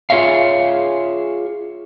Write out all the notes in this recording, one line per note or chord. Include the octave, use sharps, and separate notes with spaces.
F4 G#4 C#5 E5 F5